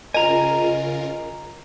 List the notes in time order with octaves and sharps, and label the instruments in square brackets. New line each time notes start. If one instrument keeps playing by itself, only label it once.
[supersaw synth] C#3 F4 A#4 [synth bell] D#5 [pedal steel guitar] G#5 A#5